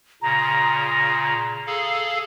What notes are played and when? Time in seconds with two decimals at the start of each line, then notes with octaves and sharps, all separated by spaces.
0.22 A#2 C#3 A#5
1.66 G#4 A4 F5